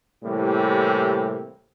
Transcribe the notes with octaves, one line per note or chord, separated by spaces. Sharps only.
A2 C3 E3 G3 A#3